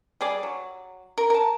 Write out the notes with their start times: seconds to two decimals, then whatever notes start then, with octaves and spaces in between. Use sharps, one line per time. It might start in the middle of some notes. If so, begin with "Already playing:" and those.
0.21 G3 G#4 D5
0.43 F#3
1.18 A#4
1.30 A#4 A5